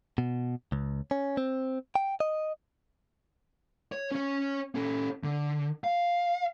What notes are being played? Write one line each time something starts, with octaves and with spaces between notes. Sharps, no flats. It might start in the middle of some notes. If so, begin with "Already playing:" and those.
B2
C#2
C#4
C4
G5
D#5
C#5
C#4 C#5
C#4 A4
D3
F5